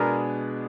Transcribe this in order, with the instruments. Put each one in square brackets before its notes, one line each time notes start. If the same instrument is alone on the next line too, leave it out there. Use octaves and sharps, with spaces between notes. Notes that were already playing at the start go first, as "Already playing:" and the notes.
Already playing: [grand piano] B2 G#3 B3 D4 G#4 [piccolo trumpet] A#4